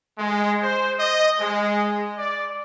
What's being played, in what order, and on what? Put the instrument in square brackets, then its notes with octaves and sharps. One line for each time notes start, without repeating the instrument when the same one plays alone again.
[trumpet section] G#3
C5
D#5
G#3
D5